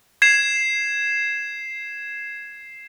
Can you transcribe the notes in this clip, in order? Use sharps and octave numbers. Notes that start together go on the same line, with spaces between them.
G#6 C7 E7